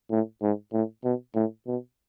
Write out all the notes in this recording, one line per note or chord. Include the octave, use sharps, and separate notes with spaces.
A2
G#2
A2
B2
A2
B2